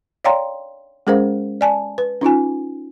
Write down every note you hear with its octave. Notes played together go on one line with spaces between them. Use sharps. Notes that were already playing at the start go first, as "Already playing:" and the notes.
C#5 D5 F5 G5 A#5 C6
G#3 C#4 G#4 A#4 C5 F5
D5 G#5 A5
B4
C#4 D#4 F4 G#5